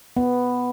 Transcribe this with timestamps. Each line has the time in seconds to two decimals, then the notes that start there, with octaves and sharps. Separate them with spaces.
0.17 B3